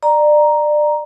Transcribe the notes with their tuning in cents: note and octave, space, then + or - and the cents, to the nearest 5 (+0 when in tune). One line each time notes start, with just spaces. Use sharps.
D5 +25 A#5 +5